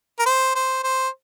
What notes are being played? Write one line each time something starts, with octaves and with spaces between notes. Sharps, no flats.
A#4
C5
C5
C5